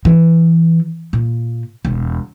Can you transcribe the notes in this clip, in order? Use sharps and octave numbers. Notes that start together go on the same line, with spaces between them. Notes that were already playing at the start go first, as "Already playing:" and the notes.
E3
A#2
E1